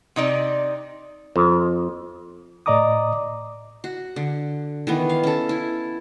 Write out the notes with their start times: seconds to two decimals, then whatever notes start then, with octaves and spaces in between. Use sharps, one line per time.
0.16 C3 D#4 D5
1.36 F2
2.66 A2 D5 D#5 A#5 D6 D#6
3.84 F#4
4.16 D3
4.87 D#3 E3 B3
5.09 F5
5.23 C#4 A4
5.49 E4